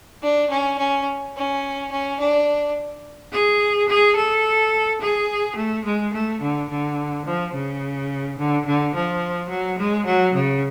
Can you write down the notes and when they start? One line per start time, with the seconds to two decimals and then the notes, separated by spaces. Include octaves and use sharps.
0.22 D4
0.50 C#4
0.78 C#4
1.35 C#4
1.91 C#4
2.19 D4
3.32 G#4
3.88 G#4
4.16 A4
5.00 G#4
5.56 A3
5.85 G#3
6.13 A3
6.41 D3
6.68 D3
7.25 F3
7.54 C#3
8.38 D3
8.65 D3
8.94 F3
9.50 F#3
9.79 G#3
10.06 F#3
10.35 C#3